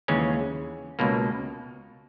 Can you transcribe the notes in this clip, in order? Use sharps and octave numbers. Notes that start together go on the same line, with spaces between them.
D#2 C#3 E3 G#3 C#4
C#2 B2 A#3